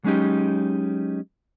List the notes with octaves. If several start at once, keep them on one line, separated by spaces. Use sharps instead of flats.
F#3 G#3 C#4 D#4 G4